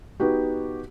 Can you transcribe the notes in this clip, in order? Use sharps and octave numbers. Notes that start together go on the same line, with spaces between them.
B3 D#4 F#4 G4